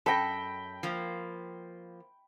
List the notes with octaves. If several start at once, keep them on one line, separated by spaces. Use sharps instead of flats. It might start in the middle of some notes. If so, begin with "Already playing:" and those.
F#2 A4 G5 A5 B5 A#6
F3 A#3